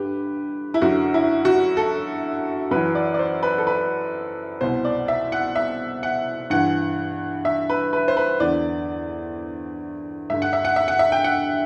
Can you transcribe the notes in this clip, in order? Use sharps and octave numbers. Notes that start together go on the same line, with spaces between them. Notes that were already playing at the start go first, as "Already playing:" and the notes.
Already playing: G2 D3 G4 B4
E4
F#2 D3 F#4
E4
F#4
A4
F#2 E3 B4
D5
D5
C5
B4
A4
B4
C2 B2 C5
D5
E5
F#5
E5
F#5
G2 E3 F#5
E5
B4
B4
C5
B4
E2 D3 D5
G2 D3 E5
F#5
E5
F#5
E5
F#5
E5
G5
F#5